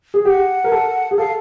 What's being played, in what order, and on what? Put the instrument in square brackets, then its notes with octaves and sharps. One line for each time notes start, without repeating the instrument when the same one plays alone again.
[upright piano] G#4
[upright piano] G4 [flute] F#5
[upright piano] A#4
A4
G#4
[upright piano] A4 [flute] F5